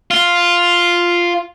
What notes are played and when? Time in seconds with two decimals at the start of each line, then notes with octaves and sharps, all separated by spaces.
0.11 F4